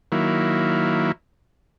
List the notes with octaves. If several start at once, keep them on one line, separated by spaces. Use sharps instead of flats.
D#3 F#3 A#3 E4